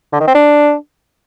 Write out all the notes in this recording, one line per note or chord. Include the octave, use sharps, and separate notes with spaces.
D3
D#3
C4
D4